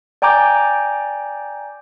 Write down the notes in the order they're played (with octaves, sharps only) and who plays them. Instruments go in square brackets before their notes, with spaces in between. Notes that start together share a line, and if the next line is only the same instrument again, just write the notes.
[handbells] D5 G5 G#5 A#5 D6 G6